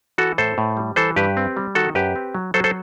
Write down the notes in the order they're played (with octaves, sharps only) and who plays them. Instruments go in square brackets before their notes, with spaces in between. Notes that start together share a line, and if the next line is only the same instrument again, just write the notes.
[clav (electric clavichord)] E3 F#4 A4
A2 A4 C5
A2
G3
E3 A4 C5
G2 G4 B4
C4
G3
D#3 F#4 A4
F#2 G4 B4
C4
F#3
F#3 A4 C5
A4 C5